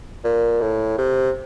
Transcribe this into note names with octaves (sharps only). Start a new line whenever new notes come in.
A#2
A2
C3